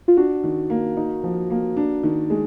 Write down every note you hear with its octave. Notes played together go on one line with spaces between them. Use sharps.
F4
D4 F#4
D#3
A#3
D#4
F3
A#3
D4
D#3
G#3